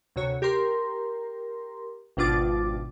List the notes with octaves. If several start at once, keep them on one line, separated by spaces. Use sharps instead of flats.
D2 C3 F#4 C#5
G4 A#4 A#5 C6
G#1 B2 D4 F4 D6 A6